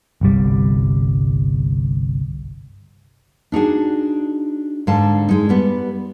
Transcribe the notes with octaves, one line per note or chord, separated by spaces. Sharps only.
G1 C2 G3
D4 D#4 F#4 G#4
G#2 D3 F5 A5
G#3 D#4
G3 B3 B4